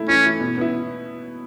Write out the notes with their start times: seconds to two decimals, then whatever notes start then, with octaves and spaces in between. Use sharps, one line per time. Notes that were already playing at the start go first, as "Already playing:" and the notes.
Already playing: A3 E4
0.08 E3 C#4
0.24 A3 E4
0.40 B2
0.57 B3 E4